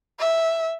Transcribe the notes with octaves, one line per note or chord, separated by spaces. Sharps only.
E5